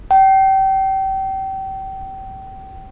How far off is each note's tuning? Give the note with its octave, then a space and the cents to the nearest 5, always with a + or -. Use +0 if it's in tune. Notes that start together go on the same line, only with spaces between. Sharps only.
G5 -30